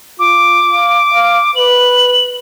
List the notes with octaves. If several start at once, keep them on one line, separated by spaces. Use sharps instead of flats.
F4 D6
F5
F5
B4 F#7